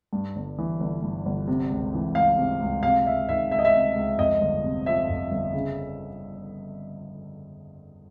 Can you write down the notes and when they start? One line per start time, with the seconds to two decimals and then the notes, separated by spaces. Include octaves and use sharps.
0.13 G2
0.36 G1
0.58 E3
0.80 G1
1.02 G2
1.25 G1
1.47 C3
1.70 C#2
1.94 E3
2.15 C#2 F5
2.38 C3
2.61 C#2
2.83 C3 F5
3.06 C#2 E5
3.28 D#3 E5
3.52 C#2 E5
3.59 D#5
3.65 E5
3.73 C3
3.96 C#2
4.18 F2 D#5
4.41 G1
4.63 C3
4.86 F3 E5
5.09 F2
5.31 G1
5.54 C#3